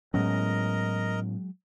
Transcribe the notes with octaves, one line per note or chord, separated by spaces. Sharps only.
A2 F#3 G#3 B3 C#4 A#4 D#5